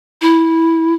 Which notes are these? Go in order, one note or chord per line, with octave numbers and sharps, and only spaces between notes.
E4